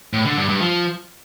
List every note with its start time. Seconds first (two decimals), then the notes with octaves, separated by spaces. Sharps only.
0.13 A2
0.25 D3
0.37 G2
0.49 G2
0.60 F3